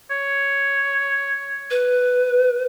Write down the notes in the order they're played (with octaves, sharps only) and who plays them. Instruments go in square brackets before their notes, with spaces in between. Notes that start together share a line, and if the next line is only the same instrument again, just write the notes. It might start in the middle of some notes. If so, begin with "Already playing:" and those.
[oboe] C#5
[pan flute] B4